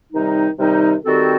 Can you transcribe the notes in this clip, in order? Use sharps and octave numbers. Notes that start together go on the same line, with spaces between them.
C3 D#3 G3 D#4
C3 D#3 G3 D#4
D#3 G3 C4 F#4 A4